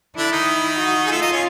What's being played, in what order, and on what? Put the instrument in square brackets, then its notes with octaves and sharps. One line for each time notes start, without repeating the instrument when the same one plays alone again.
[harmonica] D3 D4 [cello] E4
[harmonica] D#3 D#4
[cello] F#4
[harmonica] G#4
[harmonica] A3 A4 [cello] F4
[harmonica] D#4 D#5
C#4 C#5